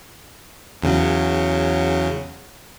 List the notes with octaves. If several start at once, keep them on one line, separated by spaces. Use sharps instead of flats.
E2 C#3 F#3